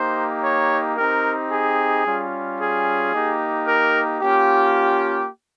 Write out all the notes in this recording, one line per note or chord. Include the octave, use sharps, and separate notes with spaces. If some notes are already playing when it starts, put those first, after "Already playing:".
Already playing: A#3 D#4 G4 C5
C#5
C4 D#4 G4 A#4
G#4
G3 C#4 F4
G#4
A#3 D#4 G4
A#4
A#3 C#4 F4 G4